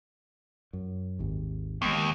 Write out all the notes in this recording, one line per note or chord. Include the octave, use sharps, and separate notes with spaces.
F#2
G#1 D#2
D#2 G#3 A#3 B3